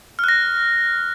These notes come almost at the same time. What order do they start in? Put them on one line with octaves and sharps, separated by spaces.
F6 F#6 A#6